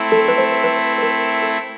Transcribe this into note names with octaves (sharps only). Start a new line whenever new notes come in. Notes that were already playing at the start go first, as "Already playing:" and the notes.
Already playing: A3 C4 E4
A4
B4
C5
B4
B4
A#4
A4